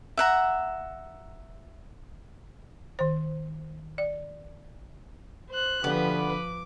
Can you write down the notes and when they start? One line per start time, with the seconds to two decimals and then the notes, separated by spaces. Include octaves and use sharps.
0.17 E5 F#5 A#5
2.99 D#3 C5
3.98 D5
5.50 C5 F#6
5.84 D3 F3 B3 G4 B4
6.17 D6